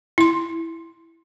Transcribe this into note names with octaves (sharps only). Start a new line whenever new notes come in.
E4 C6